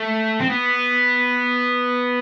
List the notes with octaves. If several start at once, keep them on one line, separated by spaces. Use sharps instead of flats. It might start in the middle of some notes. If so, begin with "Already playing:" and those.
Already playing: A3
C4
B3